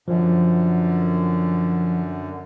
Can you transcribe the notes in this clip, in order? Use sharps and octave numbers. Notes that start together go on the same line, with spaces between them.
F#2 D3 F3